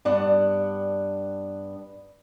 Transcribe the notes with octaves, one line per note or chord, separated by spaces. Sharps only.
G2 B3 D4 F#5